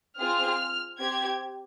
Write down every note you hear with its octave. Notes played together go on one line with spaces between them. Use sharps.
C4 F4 G#4 F6
C4 G4 G#6